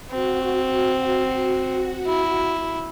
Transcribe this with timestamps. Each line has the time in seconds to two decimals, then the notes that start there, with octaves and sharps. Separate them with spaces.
0.11 C4 F#4
2.07 E4